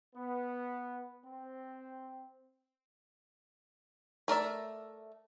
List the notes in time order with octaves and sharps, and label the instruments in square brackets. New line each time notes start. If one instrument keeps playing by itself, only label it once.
[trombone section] B3
C4
[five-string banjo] A3 A#4 D5 E5